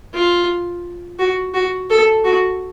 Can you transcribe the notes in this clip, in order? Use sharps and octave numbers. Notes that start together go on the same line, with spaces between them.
F4
F#4
F#4
A4
F#4